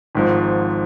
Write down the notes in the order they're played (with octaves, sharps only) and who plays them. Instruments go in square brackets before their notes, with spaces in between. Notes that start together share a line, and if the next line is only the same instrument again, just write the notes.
[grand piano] G#1 G#2 F3